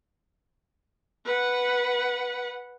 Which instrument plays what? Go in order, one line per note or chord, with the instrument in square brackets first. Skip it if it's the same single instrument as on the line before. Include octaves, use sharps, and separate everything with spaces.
[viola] B4 F#5